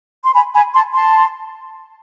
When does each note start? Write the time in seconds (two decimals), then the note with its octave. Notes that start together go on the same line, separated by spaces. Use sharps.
0.24 C6
0.33 G#5 B5
0.54 G#5 B5
0.74 A5 C6
0.94 A5 C6